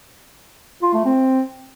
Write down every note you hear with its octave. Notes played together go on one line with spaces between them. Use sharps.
F4
A3
C4